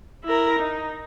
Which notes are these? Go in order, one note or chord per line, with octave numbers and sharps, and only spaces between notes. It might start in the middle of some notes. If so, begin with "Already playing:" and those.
E4 A#4
D#4